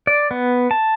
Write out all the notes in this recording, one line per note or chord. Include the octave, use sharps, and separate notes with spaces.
D5
B3
A5